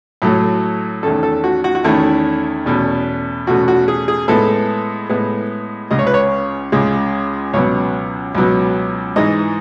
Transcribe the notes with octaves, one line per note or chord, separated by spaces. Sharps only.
A2 F#3 A3
E2 D#3 A3 C#4 A4
A4
F#4
F#4
F#4
E2 D#3 A3 C#4 E4
E2 B2 A3 C#4
E2 B2 A3 C#4 F#4
F#4
G#4
G#4
A2 G#3 B3 A4
A2 G#3 B3
C#2 C#3 G#3 D#5
C#5
B4
C#5
C#2 C#3 G#3
C#2 B2 F#3 B3 C#5
C#2 B2 F#3 B3
G#2 E3 G#3 D#5